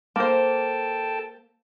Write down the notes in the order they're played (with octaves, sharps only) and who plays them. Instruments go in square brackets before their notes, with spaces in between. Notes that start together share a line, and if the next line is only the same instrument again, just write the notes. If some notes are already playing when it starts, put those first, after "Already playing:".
[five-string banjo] A#3 C5 [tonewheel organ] A4 G5 A5